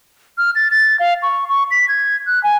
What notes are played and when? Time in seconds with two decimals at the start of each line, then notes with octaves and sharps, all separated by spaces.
0.38 F6
0.55 A6
0.71 A6
1.00 F5
1.23 C#6
1.49 C#6
1.71 B6
1.89 G#6
2.27 F#6
2.43 G#5